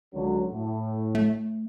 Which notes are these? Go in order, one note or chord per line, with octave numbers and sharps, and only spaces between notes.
C#2 D3 F#3
A2
A3